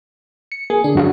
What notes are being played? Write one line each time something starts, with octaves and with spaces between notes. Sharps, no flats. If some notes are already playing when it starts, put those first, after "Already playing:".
C#7
A#3 G#4
D3 D4
F#2 F#4 F5